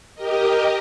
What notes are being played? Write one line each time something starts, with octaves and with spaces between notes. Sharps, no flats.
G4 A#4 D#5